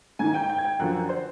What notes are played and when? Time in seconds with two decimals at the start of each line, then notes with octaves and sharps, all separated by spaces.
0.19 G#2 D#3 G#5 G#6
0.34 G5 G6
0.49 G5 G6
0.58 G#6
0.64 G5 G6
0.79 F#2 D3 F3 F#5 F#6
1.09 C5 C6